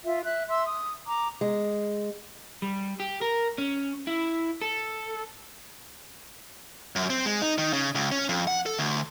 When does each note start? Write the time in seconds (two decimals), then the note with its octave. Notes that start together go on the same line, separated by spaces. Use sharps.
0.04 F4 E5
0.24 E5 F#6
0.49 E5 C6 E6
0.65 D#6
1.07 A#5 D6
1.41 G#3
2.62 G3
3.00 G4
3.21 A#4
3.58 C#4
4.07 E4
4.61 A4
6.96 F#2
7.10 C4
7.26 G#3
7.42 D#4
7.58 D#3
7.73 C#3
7.95 C#2
8.12 C#4
8.29 F2
8.47 F#5
8.66 A4
8.79 D2